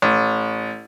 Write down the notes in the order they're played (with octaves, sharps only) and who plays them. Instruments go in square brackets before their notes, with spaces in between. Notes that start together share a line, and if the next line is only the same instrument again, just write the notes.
[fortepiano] A1